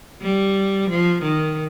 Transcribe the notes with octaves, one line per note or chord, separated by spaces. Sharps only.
G3
F3
D#3